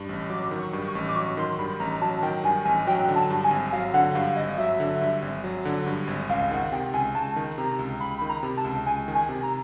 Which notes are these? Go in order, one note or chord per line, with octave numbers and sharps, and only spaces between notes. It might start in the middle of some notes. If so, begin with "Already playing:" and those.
Already playing: G2
A1
F#3 D6
D#3
C#6
G2
C#6
A1
D6
F#3 C#6
D#3 C6
G2 B5
A1 A#5
F#3 A5
D#3 G5
G2 G#5
A1 G#5
F#3 G5
D3
A5
G2
G#5
G#1
F#3 F5
D3 F#5
G2 F5
G#1 D#5
F#3 E5
D3
G2
G#1
F#3
D3
G2
G#1
C#2 F5
D#3 F#5
C3 G5
C#2 G#5
C#2 A5
D#3
C3 A#5
C#2
C#2 B5
D#3 B5
A#5
C3
A5
C#2
C#2 G#5
D#3
G#5
C3
A#5